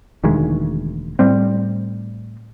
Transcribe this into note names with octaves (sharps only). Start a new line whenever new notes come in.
E1 D2 D#3 G#3
A2 G3 C4